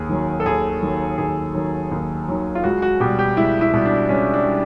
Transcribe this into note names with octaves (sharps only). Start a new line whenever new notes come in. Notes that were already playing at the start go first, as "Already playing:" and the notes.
Already playing: D#2 G#4
D#3 F#3
A4
D#2 G#4
D#3 F#3
D#2 G#4
D#3 F#3
D#2
D#3 F#3
F4
C#2 F#4
F#4
B2 G3 G4
G4
C#2 E4
E4
B2 G3
D4
C#2 C#4
D4
G3